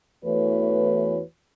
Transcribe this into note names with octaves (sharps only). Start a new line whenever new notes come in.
E2 E3 A3 F#4 B4 C#5